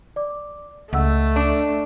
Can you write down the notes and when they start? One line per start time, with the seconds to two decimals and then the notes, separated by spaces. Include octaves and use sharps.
0.16 D5 D6
0.93 C#2 A3 D#5 F#5 E6
1.36 D4